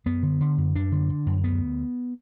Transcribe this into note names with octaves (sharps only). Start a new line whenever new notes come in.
F#2 B3
D3
D3
F#2
F#2 D4
D3
D3
F#2
D2 B3